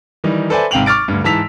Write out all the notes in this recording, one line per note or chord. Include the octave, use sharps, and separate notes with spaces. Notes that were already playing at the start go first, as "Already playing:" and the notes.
D#3 E3 G3 D#4
A4 B4 C5 D5 E5 G#5
G#1 C3 F5 G5 F7 F#7
C#6 D6 F6 A6 D7
D2 G2
G#2 E3 A5 E6 B6 F7